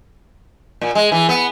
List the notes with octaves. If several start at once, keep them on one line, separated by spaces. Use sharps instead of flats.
A#2
G#3
E3
B3